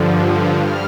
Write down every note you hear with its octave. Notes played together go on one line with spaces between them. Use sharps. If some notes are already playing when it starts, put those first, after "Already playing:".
Already playing: G2 D3 F3
G2 F6